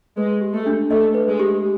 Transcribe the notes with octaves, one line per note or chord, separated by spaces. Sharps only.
G#3 B4
G4
A3
D4
A3 D#5
B4
G#3
G4